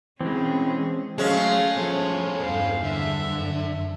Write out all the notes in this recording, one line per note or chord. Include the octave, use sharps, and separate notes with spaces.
E3 G3 G#3 C4 C#4 G#4
F#3 G#3 A3 C#4 F5
F3 B3 A4 C#5
E2 G2 C5 F5
D3 E5
F#2